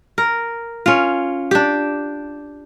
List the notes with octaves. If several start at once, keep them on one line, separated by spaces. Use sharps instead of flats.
A#4
C#4 F4
D4 G4